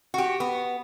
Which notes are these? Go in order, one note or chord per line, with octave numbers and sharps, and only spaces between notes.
F#4 G4
B3